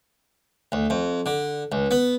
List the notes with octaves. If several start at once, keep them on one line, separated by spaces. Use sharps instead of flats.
D2
F2
D3
C#2
B3